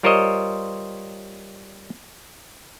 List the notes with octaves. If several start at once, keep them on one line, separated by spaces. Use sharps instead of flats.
G3 F4 A#4 C5 C#5 D#5